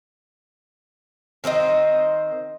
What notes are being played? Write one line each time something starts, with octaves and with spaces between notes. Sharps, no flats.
D#3 C4 C5 D#5